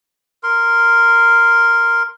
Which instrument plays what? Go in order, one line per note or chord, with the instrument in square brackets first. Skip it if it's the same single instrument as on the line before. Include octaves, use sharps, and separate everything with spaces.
[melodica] A#4 C6